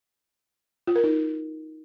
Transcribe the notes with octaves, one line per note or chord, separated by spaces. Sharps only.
F4
A#4
D#4